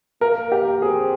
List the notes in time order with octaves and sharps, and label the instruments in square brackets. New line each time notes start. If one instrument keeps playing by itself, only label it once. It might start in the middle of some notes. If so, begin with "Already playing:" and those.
[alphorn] A#3 [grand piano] A#4
[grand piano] G4
[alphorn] C4 [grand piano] G#4